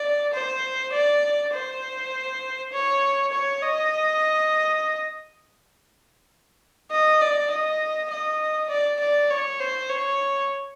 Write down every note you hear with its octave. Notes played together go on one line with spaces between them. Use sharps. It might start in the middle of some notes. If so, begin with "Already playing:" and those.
Already playing: D5
C5
D5
C5
C#5
C#5
D#5
D#5
D5
D#5
D#5
D5
D5
C#5
C5
C#5